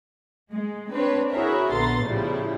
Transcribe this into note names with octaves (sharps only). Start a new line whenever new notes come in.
G#3
C4 D4 B4 C#5
E4 F#4 G#4 A#4 C#5 E5
A#1 D3 B3 A#5 C6 A6
A2 C#3 F3 G3 E4